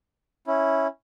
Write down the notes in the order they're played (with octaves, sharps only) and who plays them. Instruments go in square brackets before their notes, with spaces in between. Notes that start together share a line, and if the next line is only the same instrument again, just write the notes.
[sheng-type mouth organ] C#4 E4